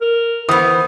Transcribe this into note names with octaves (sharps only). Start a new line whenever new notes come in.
A#4
E3 B3 C5 D#6